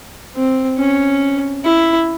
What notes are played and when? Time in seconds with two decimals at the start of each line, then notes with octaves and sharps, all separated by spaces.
0.36 C4
0.79 C#4
1.65 E4